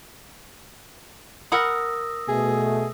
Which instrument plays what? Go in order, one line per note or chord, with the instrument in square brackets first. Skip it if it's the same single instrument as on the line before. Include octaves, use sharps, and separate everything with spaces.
[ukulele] A#4 F#5 B5 [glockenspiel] D#6 E6 A#6
[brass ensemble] B2 A3 [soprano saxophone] G#4